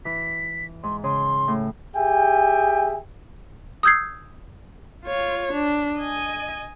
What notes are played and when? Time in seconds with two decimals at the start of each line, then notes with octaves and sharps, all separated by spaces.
0.05 E3 B6
0.83 G#2 C6
1.04 C#3 C6
1.48 A2
1.96 G4 G#4 E5 G5 G#5
3.83 D#6 E6 G6 G#6 C7
5.06 F4 C#5
5.53 D4
5.98 D#5 G#5